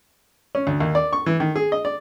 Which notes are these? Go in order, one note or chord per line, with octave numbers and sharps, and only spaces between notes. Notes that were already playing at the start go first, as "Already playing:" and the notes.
C#4
D2
D#2
D5
C#6
E3
D#3
G#4
D#5
D5